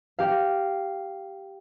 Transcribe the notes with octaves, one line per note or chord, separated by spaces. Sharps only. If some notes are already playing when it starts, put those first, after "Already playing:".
G4 F5